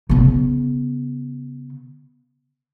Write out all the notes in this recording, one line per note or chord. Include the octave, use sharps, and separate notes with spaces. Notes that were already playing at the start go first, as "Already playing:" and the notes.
C#3 B3